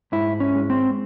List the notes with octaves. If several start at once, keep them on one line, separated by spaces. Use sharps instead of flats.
G#2 E4
C#4
G#3
C4